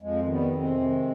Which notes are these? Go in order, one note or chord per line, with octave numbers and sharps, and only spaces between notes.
F2 F3 G#3
D#3
G3 B3
F2
G#3 C4
C3
D#3